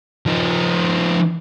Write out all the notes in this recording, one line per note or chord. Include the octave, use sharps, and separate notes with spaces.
F3 D#4